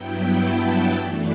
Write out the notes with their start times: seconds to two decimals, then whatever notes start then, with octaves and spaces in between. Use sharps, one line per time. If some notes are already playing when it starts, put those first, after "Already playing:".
Already playing: G2 F#3 B3 E4 G5
0.43 A5
0.97 F#2 E3 A3 D4